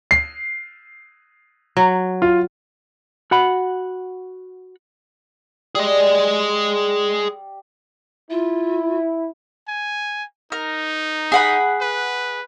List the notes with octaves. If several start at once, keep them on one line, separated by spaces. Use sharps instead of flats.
C7
F#3
F4
F#4 F#5 B5
G3 G#4 D#5
E4 F4
G#5
D#4 A#4
G#4 F#5 B5
B4